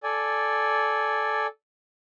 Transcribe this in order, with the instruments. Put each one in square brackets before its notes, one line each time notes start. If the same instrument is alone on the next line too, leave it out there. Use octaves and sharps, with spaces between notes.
[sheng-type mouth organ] A4 D5 G#5